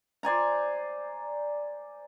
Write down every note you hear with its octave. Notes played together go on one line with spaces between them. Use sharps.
C5 D5 G#5 A#5